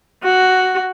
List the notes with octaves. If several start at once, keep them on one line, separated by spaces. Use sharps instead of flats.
F#4